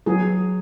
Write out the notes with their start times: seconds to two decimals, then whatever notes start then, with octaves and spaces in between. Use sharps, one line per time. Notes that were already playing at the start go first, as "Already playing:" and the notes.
0.06 F#3 B3 F#4 G#4